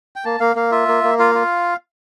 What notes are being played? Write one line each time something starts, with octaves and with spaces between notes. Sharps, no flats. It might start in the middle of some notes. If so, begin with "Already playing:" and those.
G5
A#3 A5
A#3 F5
A#3 F5
F4 E5
A#3
A#3
F4 F5
F4